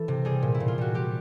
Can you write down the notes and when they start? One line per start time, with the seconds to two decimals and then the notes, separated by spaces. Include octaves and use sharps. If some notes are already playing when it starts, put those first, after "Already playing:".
Already playing: E3 A4
0.08 C3
0.25 G3 G#4
0.42 A#2
0.55 E4
0.60 A#2
0.68 F4
0.78 G3 F#4
0.94 G3 G4